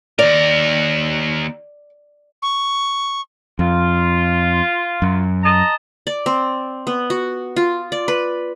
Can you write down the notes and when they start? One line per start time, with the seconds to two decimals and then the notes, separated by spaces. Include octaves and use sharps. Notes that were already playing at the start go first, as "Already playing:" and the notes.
0.19 D#2 A#4 D5
2.42 C#6
3.59 F2 F4
5.02 F#2
5.43 D#5 A5 A#5
6.07 D5
6.26 C4
6.87 B3
7.10 F#4
7.56 F4
7.92 D5
8.08 B4